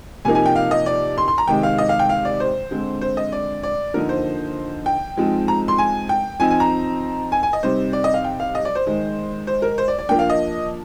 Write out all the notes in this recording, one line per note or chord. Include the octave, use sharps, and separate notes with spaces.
C3 F3 A#3 D#4 G#5
G#5
G5
F5
D#5
D5
C6
C6
A#5
C3 D#3 G#3 C4 G5
F5
D#5
F5
G5
F5
D5
C5
D3 G#3 C4
C5
D#5
D5
D5
D3 F3 A#3 D#4 A#4
C5
G5
F3 G#3 C4 D#4
A#5
C6
G#5
G5
F3 C4 D#4 G#5
G#5
A#5
G#5
G#5
D#5
C3 G3 C4 D#4 C5
D5
D#5
F5
G5
F5
D#5
D5
C5
D#3 G#3 D#4
C5
A#4
C5
D5
D5
F3 A#3 D4 G5
F5
D#5